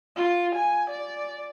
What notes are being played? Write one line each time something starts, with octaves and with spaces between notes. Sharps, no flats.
F4
G#5
D5